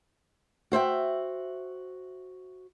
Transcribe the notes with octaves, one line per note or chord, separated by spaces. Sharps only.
F#4 C5 E5 G5